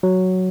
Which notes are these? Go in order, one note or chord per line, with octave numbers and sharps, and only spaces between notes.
F#3